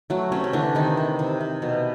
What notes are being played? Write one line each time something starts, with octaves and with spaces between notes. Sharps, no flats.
F#3 A3 F#4
C3 C#4
C#4
D3 E3 D4
C3 D#3 D#4
C3
C3
C3
B2